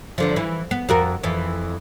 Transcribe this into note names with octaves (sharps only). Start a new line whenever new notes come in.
E2 D3 F3
E3
B3
F2 F#4 A#4
F2 E3